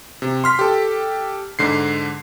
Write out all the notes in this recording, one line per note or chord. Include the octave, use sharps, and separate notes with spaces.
C3
C6 F6 B6
G4 A4
G#2 D3 C7